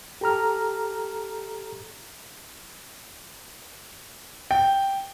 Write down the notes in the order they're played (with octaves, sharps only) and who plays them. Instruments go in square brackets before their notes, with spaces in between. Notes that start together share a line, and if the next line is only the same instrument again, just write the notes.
[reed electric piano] G4 A4 A#5 F6
[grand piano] G5